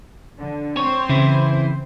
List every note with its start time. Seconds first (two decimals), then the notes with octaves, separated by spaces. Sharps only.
0.37 D3
0.77 C4 C5 C#5
1.09 C#3 E3 E4